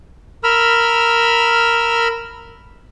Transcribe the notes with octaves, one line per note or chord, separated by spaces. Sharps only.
A#4 B5 E6 F6